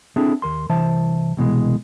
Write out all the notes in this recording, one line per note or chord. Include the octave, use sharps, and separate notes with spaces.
C4 D4 E4 G#4 A4
D#2 A#4 C6
C2 E3 C5 E5 A5
C2 B2 E3 G#3